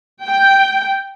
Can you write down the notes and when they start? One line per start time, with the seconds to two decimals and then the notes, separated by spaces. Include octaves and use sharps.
0.24 G5